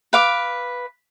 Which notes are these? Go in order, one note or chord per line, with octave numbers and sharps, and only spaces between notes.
B4 F5 D6